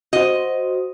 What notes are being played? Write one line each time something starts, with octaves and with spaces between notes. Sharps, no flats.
F#4 C5 D#5